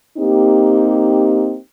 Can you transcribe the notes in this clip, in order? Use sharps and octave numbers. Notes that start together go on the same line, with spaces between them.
A#3 C4 D#4 G4